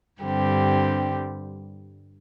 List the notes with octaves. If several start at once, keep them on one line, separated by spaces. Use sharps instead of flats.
G2 D3 G3 C4 G4